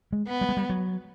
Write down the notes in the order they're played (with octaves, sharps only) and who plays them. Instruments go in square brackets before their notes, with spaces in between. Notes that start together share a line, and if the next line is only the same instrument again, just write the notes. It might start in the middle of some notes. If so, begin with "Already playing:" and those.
[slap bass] G#3
[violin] B3
[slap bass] G3
G#3
G3
F#3